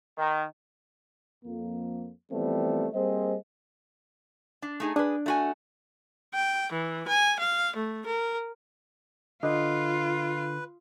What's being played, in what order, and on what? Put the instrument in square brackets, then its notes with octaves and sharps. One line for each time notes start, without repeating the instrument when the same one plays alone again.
[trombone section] D#3
[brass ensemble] F2 A#3
E3 F3 G3 A3 B3 C4
G3 A#3 C4 G#4 C5 D#5
[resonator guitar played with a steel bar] D4
A3 D#4 G#4
[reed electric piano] D4 [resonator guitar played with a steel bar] G#4 B4
[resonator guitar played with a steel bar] A3 F#4 G#5
[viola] G5
E3
G#5
F5
A3
A#4
[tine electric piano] D3 [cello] F4 [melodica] B4 [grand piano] D#5